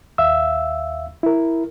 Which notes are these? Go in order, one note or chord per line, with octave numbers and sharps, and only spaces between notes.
D#2 E5 F5 E6
E4 A#4